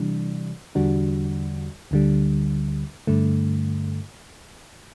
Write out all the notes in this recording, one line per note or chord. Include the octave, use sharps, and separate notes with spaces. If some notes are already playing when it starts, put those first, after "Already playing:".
Already playing: C3 E3 G3 D4
E2 D3 G3 D4 F#4
D2 D3 G3
G2 D3 A3